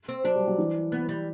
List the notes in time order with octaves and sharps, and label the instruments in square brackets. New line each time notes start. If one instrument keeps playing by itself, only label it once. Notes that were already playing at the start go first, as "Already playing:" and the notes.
[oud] C4
[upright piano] F#3 [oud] D4
[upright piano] G3
F#3
E3
[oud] B3
G3